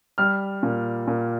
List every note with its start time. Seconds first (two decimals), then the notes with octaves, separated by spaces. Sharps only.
0.18 G3 F6
0.63 A#2
1.07 A#2